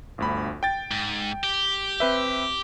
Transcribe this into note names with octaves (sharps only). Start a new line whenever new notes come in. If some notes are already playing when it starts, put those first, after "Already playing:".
G1 D2 B5
G5 A6
G#2
G4
C4 B4 E5